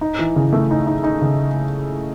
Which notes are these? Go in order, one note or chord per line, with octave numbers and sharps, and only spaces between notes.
D#4
E3
C#3
A3
D#4
D#4
D#4
C#3